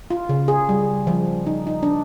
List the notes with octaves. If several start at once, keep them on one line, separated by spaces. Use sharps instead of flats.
F4
C#3
G#4
G3
F3
D#4
D#4
D4